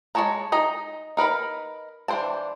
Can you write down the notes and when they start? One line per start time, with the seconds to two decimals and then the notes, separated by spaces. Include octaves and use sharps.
0.15 G#3 A#4 C#5 A5 A#5
0.52 D#4 D#5 A#5
1.17 D#4 A#4 B4 B5
2.08 E3 D4 C5 G5 A5